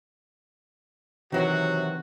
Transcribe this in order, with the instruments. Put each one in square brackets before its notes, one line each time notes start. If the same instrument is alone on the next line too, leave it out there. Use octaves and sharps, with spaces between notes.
[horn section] C3 F#3 F#4 [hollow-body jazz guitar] D#3 E3